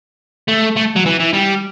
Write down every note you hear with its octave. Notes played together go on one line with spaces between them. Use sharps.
A3
A3
F#3
E3
E3
G3